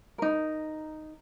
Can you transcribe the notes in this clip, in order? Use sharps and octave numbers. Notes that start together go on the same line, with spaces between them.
D#4 A#4